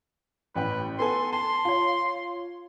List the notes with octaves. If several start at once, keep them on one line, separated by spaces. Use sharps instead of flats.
A1 B4 G5
B3 A4 G#5 C6
A5 C6
F4 C#5